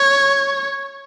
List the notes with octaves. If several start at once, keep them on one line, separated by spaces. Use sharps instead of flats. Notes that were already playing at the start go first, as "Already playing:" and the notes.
Already playing: C#5